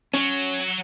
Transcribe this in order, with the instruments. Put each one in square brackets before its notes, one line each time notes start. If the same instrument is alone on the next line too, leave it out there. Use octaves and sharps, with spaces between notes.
[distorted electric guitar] F#3 [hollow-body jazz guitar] C#4